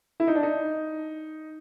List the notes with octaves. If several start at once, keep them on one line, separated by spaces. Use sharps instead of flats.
E4
D#4
D4
D#4